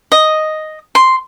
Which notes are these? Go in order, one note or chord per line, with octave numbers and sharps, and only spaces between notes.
D#5
C6